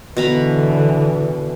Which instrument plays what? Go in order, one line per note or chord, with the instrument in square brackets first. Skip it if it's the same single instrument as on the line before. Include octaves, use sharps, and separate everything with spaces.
[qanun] B2 A#5 B5 [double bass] D3 E3